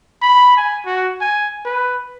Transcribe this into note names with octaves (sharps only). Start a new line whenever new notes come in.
B5
G#5
F#4
G#5
B4